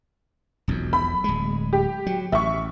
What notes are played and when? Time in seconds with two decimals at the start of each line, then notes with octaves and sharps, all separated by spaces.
0.68 E1 B1 F2
0.93 B5
1.24 D1 G#3
1.73 G4
2.06 F#3
2.32 A1 E5 C#6